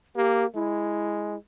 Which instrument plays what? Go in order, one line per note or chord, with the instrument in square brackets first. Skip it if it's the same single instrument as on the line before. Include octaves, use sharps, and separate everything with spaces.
[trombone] A#3 [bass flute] G4
[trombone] G#3 [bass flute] E4